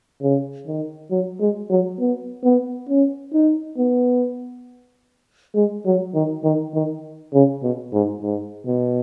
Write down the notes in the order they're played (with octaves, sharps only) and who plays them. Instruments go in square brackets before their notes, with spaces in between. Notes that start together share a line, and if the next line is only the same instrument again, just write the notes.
[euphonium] C#3
D#3
F#3
G#3
F#3
B3
B3
C#4
D#4
B3
G#3
F#3
D#3
D#3
D#3
C#3
B2
G#2
G#2
B2